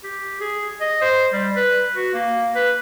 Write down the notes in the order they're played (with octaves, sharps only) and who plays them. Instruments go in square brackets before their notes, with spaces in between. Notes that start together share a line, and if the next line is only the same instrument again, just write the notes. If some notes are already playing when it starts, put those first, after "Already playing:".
[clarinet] G4
G#4
D#5
C5
G3
B4
F#4
A#3
B4